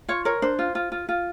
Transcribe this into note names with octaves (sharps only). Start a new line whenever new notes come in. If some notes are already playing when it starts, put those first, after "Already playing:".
F4 C#5
A#4 C#5
D4 C5
F4
F4
F4
F4